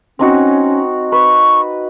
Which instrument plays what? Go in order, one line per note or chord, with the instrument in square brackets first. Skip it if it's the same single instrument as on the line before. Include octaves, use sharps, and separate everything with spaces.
[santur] C4 D#4 F#4 [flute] C#4
[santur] B4 [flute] C#6